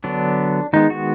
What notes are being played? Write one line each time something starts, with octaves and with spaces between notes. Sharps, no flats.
D3 F#3 B3 D4
D#3 G#3 B3 D#4
F#4